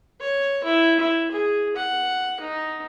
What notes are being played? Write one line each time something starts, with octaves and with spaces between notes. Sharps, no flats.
C#5
E4
E4
G#4
F#5
D#4